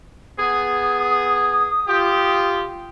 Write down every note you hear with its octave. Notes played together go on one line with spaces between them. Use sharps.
B3 G#4 D#6
F4 G4